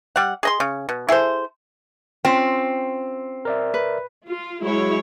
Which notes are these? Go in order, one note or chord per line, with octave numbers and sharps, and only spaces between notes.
G3 F#5
G#4 D#5 C6
C#3
B2
E4 G#4 A4 C5
C4 C#4 F4 G5
A#4 D5 E5
B4
F4
F#3 G#3 E4 C#5